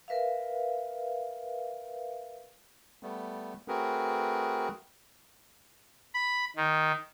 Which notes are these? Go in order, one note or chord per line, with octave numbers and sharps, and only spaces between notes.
A#4 B4 E5 F5
G3 A3 B3
A3 C4 F#4 G#4 A#4 B4
B5
D#3